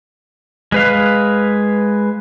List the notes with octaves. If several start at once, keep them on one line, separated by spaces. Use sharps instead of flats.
G#3 B4 F5